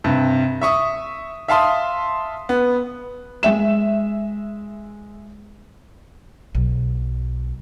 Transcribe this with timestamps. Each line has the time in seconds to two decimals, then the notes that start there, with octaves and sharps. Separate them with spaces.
0.04 G2 C3
0.61 E5 C#6 D#6
1.48 E5 F5 A5 C6 D#6
2.49 B3
3.43 G#3 E5 E7
6.55 B1